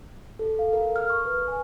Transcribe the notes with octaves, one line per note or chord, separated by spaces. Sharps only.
A4
F5
A#4
F6
C#6
B4
G#5